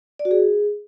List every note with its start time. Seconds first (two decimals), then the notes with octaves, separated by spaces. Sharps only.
0.19 D5
0.25 F#4
0.31 G#4